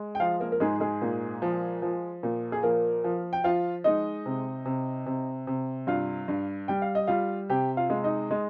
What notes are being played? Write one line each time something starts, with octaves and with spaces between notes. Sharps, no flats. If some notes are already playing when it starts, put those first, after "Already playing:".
Already playing: G#3
G5
F3 F4 F5
A#3 A#4
A#4
G#2 G#3 G#4
G#3 G#4
A#2
F3
F3
A#2
G#4
F3 A#3 A#4
F3
G5
F3 F4 F5
G#3 D#4 D#5
C3
C3
C3
C3
G2 F4 F5
G2
G3 G5
F5
D#5
G3 F4 F5
C3 G4 G5
F4 F5
G#3
D#4 D#5
G#3